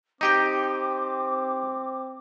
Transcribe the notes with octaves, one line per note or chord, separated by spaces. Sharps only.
C4 D#4 G4 G5 D6